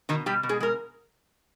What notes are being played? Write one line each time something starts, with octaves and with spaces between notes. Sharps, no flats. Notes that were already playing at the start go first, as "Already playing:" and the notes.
B2 D#3 D#4
B2 G3 G4
B2
G#3 G#4
G#3 A#4